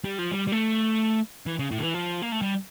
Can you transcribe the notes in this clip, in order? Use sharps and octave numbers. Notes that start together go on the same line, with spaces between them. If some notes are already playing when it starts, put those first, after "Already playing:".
G3
F3
G3
G3
A3
E3
C#3
A2
D3
E3
F3
A#3
A3
G3